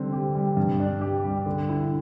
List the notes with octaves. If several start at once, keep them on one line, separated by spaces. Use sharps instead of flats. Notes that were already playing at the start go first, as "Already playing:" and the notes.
Already playing: D3 G3 C4
G4
G3
G2
D4
G4
G3
D3
E4